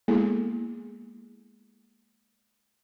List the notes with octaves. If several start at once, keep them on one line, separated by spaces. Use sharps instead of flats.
G#3 A#3 B3 E4 G#4 A4